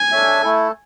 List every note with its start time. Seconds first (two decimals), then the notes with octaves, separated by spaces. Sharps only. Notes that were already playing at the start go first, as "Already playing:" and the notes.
Already playing: G#5
0.12 D4 A4 C#5 E5
0.42 A3 E4 A4